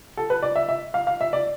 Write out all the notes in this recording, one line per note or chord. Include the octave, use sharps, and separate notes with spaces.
A4
B4
D5
E5
E5
F5
F5
E5
D5